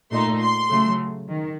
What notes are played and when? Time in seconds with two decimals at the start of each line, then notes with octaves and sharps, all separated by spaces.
0.11 A#2 A3 D#4 C6
0.41 C6
0.70 C#3 F#3 A3
1.29 D#3